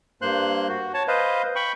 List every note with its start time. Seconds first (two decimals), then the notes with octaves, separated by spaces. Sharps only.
0.22 G2 A#3 C5 C6 F#6
0.68 F#4
0.94 C#5 A5
1.08 B4 C5 D#5 F5
1.56 G5 B5 C#6